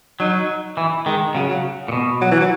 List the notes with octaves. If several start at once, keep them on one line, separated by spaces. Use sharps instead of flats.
F#3 D#4
E3
D#3 G#3
C#3 F#3
F#3
A#2
B2
F#3
E3
F#3